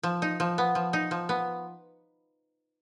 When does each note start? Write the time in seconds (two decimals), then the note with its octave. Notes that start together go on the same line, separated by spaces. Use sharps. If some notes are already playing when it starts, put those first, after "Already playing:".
0.03 F3
0.22 D#4
0.40 F3
0.58 B3
0.75 F3
0.93 D#4
1.11 F3
1.29 B3